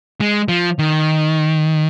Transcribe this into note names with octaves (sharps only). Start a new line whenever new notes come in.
G#3
F3
D#3